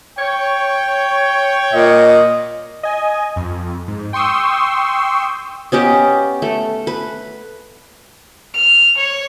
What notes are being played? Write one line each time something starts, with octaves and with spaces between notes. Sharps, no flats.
C#5 G5
A#2 D#5
D#5 G#5
F2
G#2
G5 C6 C#6 D#6 E6
B3 C#4 G4 D#5
A3
B4
F6
C#5